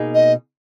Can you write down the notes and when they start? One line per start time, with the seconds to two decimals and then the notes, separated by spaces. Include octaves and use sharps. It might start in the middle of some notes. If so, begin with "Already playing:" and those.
Already playing: B2 A#3 D#4 G#4
0.15 D#5